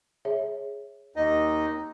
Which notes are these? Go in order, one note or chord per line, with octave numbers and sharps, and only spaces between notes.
G#4 C#5 E5
D#2 D#4 D#5